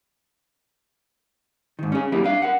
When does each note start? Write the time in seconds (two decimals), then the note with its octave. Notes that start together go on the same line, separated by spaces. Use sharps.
1.79 G#2 D#3
1.92 C#4 G#4
2.12 F#3 G3 A#3 E4 G4
2.24 D4 F5
2.42 A#4 F#5